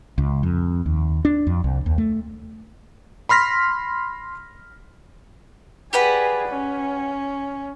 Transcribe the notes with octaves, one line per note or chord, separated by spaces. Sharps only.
C#2
F2
D#2
D4
F2
C2
D#2
A3
B5 C6 F6 A#6 B6
G4 G#4 B4 D5 F#5
C#4